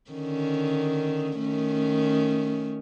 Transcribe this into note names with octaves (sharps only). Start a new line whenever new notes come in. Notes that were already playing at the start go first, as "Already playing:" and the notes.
D3 D#3 C#4
D#3 A3 C#4